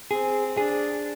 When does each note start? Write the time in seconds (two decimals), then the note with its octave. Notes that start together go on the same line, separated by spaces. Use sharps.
0.11 C4 G#4
0.57 D4 G#4